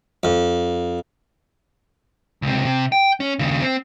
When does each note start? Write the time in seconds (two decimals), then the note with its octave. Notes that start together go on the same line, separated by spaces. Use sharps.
0.23 F2
2.42 C#2 C3
2.65 C3
2.92 G5
3.20 C#4
3.39 D#2 C#3
3.62 C4